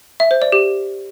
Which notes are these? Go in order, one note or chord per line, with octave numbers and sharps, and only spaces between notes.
E5
C5
D5
G4